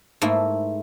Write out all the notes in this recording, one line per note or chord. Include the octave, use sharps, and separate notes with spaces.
G#2 A3 A#3 E4